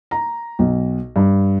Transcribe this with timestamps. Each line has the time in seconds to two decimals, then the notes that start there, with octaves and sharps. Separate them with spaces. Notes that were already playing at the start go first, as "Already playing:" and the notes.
0.11 A#5
0.59 B1
1.16 G2